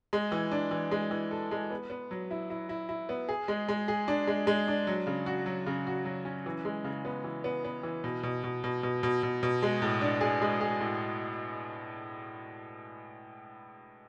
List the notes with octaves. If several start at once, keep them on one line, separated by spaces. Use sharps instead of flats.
G#3
E3
D4
E3
G#3
E3
A4
G#3
B3
B3
F#3
E4
E4
E4
E4
B3
G#4
G#3
G#3
G#4
D4
G#3
G#3
D4
F#3
C#3
F#4
F#3
C#3
F#4
F#3
C#4
E3
G#3
C#3
B3
E3
B3
B3
E3
B2
B2
B2
B2
B2
B2
B2
B2
G#3
A2
D4
G#4
G#3
G#4
A2